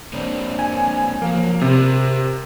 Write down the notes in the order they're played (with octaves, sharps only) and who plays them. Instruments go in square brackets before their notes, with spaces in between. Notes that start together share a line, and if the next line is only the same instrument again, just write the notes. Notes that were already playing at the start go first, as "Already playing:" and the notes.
[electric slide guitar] A#3 C4 D4
[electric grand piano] G#5
[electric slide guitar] F3 F#3 [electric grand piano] A#3
[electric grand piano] C3 [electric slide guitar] A#4 C5